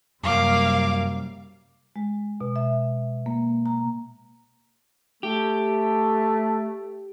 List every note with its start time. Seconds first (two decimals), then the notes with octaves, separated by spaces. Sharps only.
0.24 F#2 C3 G3 A#3 F5 D6
1.96 G#3
2.41 B2
2.56 E5
3.26 A#3
3.66 A#5
5.23 A3 G4